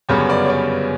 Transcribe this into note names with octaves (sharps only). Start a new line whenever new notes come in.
G1 F#2 C#3 G3 B3 C#5
D5
C#5
D5